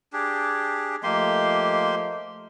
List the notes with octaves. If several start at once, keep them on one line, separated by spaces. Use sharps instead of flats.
D4 G4 G#4
F3 A3 A#3 G4 D#5 C6